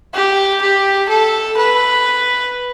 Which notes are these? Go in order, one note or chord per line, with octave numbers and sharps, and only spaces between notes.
G4
G4
A4
B4